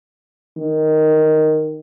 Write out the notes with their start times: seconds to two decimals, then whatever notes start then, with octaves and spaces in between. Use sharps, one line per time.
0.58 D#3